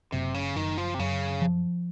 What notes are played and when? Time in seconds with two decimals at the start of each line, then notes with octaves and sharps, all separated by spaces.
0.12 F#1 C3
0.34 C#3
0.56 F#1 D#3
0.77 F3
0.94 C3
0.99 F#2 C#3
1.42 F3